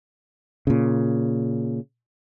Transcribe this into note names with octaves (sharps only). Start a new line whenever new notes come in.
A#2 C#3